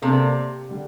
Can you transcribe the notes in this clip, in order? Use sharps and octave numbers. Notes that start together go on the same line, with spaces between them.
C3 A#3 D4 A4
D3 G3 D4 G4